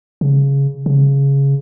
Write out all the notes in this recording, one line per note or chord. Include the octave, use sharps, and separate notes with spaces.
C#3
C#3